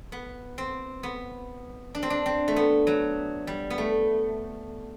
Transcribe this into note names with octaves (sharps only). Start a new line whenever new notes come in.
B3
C4
B3
D4
C4
D4
C4
A3
B3
F#3
G3
B3
A3